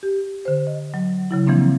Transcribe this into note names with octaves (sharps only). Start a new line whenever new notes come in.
G4
D3 C5
D#5
F#3
C#3 F#3 E4
E3 F3 A#3 C4 D4